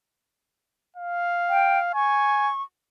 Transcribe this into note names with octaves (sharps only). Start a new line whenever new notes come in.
F5
G5
G#5 C#6